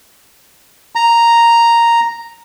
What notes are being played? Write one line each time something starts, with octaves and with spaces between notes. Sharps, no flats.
A#5